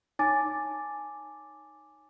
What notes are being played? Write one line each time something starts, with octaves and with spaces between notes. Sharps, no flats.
D#4 C#5 G#5 A5 D6 A6